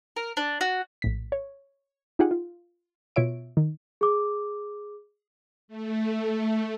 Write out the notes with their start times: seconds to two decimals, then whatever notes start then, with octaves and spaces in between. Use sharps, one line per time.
0.16 A#4
0.37 D4
0.61 F#4
1.02 A#1 A2 B6
1.32 C#5
2.19 D#4 F4 G4 G#4 F#5
2.31 F4
3.16 B2 F4 C#5 E5 D7
3.57 D#3
4.01 G#4 D6
5.68 A3